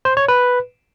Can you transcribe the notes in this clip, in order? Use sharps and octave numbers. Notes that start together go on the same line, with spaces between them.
C5
C#5
B4